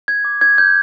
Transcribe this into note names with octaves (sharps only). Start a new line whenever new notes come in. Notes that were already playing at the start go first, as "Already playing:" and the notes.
G#6
D6
G#6
G6